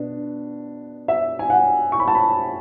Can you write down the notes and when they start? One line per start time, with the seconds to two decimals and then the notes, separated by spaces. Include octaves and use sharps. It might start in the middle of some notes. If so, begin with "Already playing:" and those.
Already playing: B2 B3 D4
1.08 E5
1.39 G#5
1.50 F#5
1.92 C#6
2.00 B5
2.08 A5
2.15 B5